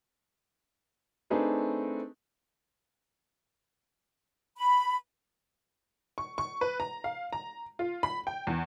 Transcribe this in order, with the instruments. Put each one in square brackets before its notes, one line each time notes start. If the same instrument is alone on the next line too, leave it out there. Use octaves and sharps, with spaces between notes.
[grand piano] A3 C4 D4 D#4 G#4 B4
[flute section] B5
[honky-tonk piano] C#6
C#6
B4
A#5
F5
A#5
F4
B5
G5
E2